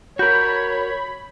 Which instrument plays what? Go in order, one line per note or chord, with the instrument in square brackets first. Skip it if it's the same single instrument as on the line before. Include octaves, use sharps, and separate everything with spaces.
[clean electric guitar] F#4 A#4 [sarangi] C#5 [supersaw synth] B5 [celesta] G6